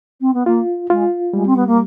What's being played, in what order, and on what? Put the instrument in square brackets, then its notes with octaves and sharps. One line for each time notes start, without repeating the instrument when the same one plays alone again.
[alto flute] C4
B3
[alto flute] A#3 [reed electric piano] F4
[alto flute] G#3 [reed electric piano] F4
[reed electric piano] G3 [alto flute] G#3
[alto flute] C4
B3
A#3